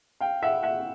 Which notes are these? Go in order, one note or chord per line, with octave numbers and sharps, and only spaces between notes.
F5 G5
E5 F#5
E5 F#5